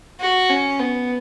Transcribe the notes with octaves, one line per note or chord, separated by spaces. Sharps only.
F#4
C#4
B3